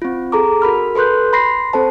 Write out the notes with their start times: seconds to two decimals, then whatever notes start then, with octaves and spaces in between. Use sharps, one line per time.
0.02 C4 F4
0.32 G#4 A4 A#5 D6
0.62 F#4 A#4 B5 F6
0.95 A4 B4 C6 F#6 G6
1.33 B5 C6 A#6 C7
1.73 C4 A4 C5 A5